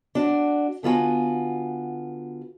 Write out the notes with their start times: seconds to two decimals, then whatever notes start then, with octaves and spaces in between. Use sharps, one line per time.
0.15 D4 F#4
0.83 D3 B3 F4 F#4 G#5